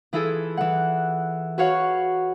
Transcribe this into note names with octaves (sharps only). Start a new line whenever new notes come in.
E3 E4 F4 G#4 A4
E3 F#5
F#4 B4 C#5 F5 F#5